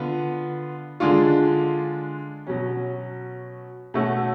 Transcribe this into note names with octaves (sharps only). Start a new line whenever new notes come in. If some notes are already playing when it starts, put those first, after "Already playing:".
Already playing: D3 B3 F4
D3 G#3 D4 F4
B2 F#3 C#4
B2 A3 C#4 F#4